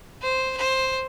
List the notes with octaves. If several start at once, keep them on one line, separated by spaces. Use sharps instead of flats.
C5
C5